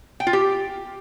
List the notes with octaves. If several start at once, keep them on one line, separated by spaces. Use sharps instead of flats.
G5
F4
G4